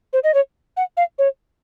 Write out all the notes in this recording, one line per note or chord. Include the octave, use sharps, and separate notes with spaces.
C5
D#5
C#5
F#5
F5
C#5